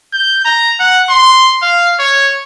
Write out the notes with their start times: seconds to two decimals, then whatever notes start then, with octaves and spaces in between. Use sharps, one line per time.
0.13 G6
0.45 A#5
0.80 F#5
1.09 C6
1.62 F5
1.99 C#5